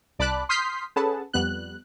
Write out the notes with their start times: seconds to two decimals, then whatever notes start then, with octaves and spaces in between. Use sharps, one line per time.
0.19 C2 D5 A5 B5 D6 F#6
0.49 C6 D#6 F6 G6 B6 C7
0.96 C#4 G#4 A4 B4 F#5 A5
1.33 F2 G3 B3 F#6